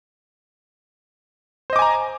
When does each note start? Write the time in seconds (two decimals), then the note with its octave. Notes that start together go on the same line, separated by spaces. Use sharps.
1.70 C5
1.73 D#5
1.76 D6
1.79 G#5
1.82 A#5